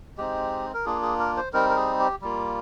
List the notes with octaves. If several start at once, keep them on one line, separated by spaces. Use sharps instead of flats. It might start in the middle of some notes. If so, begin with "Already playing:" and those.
G#3 C4 D#4 G4
A#4
A#3 D4 F4 G#4
G#4
A#4
C5
G3 C4 D#4 A#4
A#4
G#4
G4
G3 A#3 F4